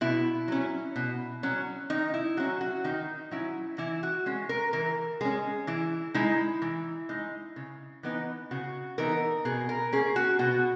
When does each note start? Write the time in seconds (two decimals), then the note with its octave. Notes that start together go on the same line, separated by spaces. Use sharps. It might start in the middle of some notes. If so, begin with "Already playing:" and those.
0.01 B2 E4
0.48 F#3 C#4
0.96 B2
1.43 F#3 C#4
1.90 D#3 D#4
2.14 E4
2.37 F#3 C#4 F#4
2.61 F#4
2.84 D#3 D#4
3.31 F#3 C#4 E4
3.78 E3 E4
4.03 F#4
4.26 G#3 C#4
4.49 A#4
4.73 E3 A#4
5.21 G#3 C#4 G#4
5.67 E3 E4
6.14 G#3 D#4 E4
6.62 E3
7.09 G#3 D#4
7.56 C#3
8.03 E3 B3 D#4
8.51 C#3 F#4
8.98 E3 B3 D#4 A#4
9.45 B2 G#4
9.69 A#4
9.93 A#3 C#4 G#4
10.16 F#4
10.39 B2 F#4